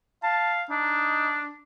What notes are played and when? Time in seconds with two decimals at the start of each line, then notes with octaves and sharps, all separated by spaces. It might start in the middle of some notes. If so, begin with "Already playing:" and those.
0.23 F5 A5
0.70 D4 D#4